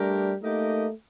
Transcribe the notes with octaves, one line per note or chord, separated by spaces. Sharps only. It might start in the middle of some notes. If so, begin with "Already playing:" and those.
Already playing: G3 A3 D4 G4 A#4
A3 A#3 D#4 G4 A#4 D#5